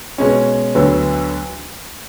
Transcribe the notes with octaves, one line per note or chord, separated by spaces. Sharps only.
B2 G#3 C#4
D2 D3 F#3 B3